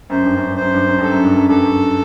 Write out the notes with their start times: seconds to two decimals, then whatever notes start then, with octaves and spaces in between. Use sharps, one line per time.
0.10 F#2 C5
0.23 G2
0.36 F#2
0.47 G2
0.56 C5
0.61 F#2
0.73 G2
0.86 F#2
0.98 G2 A4
1.11 F#2
1.24 G2
1.36 F#2
1.49 G2 A4
1.61 F#2